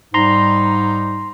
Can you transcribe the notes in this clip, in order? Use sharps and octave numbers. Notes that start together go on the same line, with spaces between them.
G#2 G3 D#4 A#5 C6